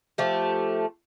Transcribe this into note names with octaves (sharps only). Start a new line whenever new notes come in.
F3 A3 G4